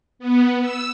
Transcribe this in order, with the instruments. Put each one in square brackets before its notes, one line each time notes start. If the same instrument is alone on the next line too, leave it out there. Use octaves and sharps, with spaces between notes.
[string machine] B3
E6